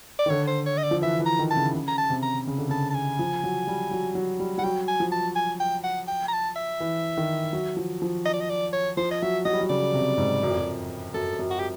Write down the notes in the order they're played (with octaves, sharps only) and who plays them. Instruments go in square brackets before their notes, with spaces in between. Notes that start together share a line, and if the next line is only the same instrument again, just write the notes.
[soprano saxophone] D5
[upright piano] D#3
[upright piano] D3 [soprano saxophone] C#5
[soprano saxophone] C5
C#5
D#5
D5
[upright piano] F3
[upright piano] E3 [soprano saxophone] E5
[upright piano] E3
[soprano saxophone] A#5
[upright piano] D#3
[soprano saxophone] A5
[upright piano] C#3
C#3
[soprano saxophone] A#5
A5
[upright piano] C3
[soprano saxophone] A#5
[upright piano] C#3
D3
[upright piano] C#3 [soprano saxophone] A5
[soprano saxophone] A5
G#5
[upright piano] F3
F#3
G3
F#3
F#3
G3
[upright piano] G3 [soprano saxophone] F#5
[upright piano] F#3 [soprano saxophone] G5
[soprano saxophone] G#5
[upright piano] F3
[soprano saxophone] A5
G#5
G5
F#5
G5
A#5
A5
E5
[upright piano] E3
D#3
F#3
F3
F3
[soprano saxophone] D#5
D5
D#5
D5
C#5
[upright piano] F3 [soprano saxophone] C5
[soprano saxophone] D#5
[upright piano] F#3 [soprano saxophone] E5
[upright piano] F#3 [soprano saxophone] D#5
[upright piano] G3
F#3
[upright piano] C#3 [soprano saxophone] D5
[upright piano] C3
G#2
F#2
F2
F#2
[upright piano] F#2 [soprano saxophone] A4
[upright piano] F#2
[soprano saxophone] F#4
G4